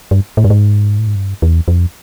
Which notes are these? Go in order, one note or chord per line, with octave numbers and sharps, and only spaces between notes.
G2
A2
G2
G#2
A2
G#2
G2
E2
F2